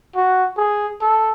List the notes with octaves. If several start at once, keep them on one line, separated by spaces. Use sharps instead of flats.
F#4
G#4
A4